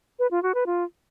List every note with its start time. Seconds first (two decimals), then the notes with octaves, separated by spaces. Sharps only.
0.19 B4
0.31 F4
0.43 F#4
0.55 B4
0.66 F4